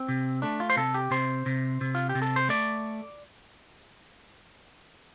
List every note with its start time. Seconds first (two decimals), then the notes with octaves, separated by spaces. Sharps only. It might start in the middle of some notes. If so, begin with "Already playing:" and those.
Already playing: C4
0.08 C3
0.42 A3 D4
0.60 F4
0.70 C5
0.77 C3 A4
0.94 G4
1.11 C3 C5
1.46 C3
1.81 C3
1.95 F4
2.09 G4
2.15 C3
2.22 A4
2.36 C5
2.49 A3 D5